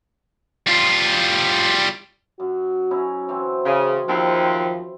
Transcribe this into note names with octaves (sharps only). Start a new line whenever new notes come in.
G3 F4
F#2 F#4
C#4 D#4 E4
E3 F#3 C4 C5
C#3
D#2 F3 C4 E5